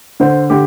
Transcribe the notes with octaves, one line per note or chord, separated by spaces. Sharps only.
D3 C5
D3 G4